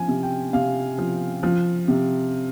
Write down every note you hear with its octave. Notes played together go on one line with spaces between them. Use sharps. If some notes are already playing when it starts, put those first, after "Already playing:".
Already playing: F3 G#5
C3
G5
C3 F5
F3
F3
C3